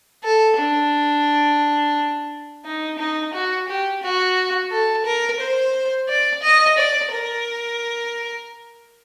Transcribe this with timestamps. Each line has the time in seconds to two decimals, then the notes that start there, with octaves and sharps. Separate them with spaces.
0.24 A4
0.58 D4
2.65 D#4
2.99 D#4
3.34 F#4
3.68 G4
4.03 F#4
4.72 A4
5.06 A#4
5.40 C5
6.09 D5
6.43 D#5
6.78 D5
7.12 A#4